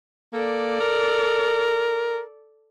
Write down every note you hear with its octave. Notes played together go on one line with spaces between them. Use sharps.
A#3 A4 D5
A#4